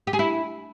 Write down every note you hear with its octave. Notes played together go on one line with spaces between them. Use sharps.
G4
G#4
E4